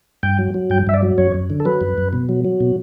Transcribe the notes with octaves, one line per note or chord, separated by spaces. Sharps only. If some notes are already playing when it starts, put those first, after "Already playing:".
G2 G5
F#3
F#3
G2 G5
G2 E5
D5
F#3
F#2 C#5
F#2
D3
A4
F#3 B4
F#2
F#2
B2
F#3
F#3
B2